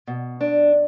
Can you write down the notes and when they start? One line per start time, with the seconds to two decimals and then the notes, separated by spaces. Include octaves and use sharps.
0.07 B2
0.41 D4